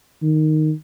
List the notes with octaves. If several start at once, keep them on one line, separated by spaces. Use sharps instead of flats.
D#3